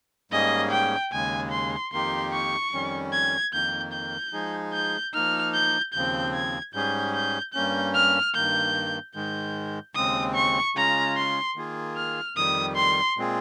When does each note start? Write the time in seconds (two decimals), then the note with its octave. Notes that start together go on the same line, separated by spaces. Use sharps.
0.31 G#2 G3 A#3 C#4 G#4 D#5
0.71 G5
1.12 D#2 C#3 G#3 G#5
1.51 C6
1.92 F2 D#3 A#3 D#4 G4 C6
2.32 C#6
2.72 F2 D#3 G3 C#4
3.12 G#6
3.53 F2 D#3 A#3 G6
3.93 G6
4.33 F3 G#3 D#4 G#4
4.73 G6
5.14 F3 A#3 D#4 F6
5.54 G6
5.94 D#2 C#3 F3 C4 G6
6.35 G#6
6.74 G#2 G3 C#4 G#4 G6
7.14 G6
7.54 G2 G3 A#3 C#4 G6
7.94 F6
8.34 G2 D#3 A#3 G6
9.15 G#2 D#3 G#3 G6
9.95 D#2 C#3 G#3 C4 D#6
10.35 C#6
10.76 C#3 G#3 C#4 F4 A#5
11.16 C6
11.56 D#3 A#3 F4 G#4
11.96 F6
12.36 F2 D#3 G3 D#6
12.76 C6
13.17 A#2 G#3 C4 F4 G#4